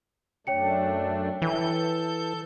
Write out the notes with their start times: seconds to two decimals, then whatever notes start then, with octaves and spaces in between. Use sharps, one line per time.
0.47 F#2 A3 D4 C#5 G5 C#7
1.42 E3 A4 G6